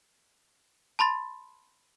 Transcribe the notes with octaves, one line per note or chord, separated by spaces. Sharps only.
A5 B5 C6 A6